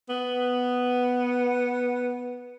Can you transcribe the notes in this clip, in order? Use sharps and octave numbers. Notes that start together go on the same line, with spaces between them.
B3